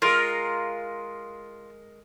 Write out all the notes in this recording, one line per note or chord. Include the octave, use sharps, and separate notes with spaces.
G#3 F4 G#4 A#4